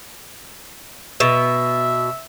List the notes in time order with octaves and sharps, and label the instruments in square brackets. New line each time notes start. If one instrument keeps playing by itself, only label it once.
[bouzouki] B2 [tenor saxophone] E5